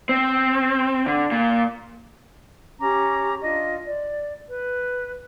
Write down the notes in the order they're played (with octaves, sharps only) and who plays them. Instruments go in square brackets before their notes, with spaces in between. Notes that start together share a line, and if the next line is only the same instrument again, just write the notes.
[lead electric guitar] C4
D3
A#2
[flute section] C#4 G4 A#5 D6
D4 F4 D#5
D5
B4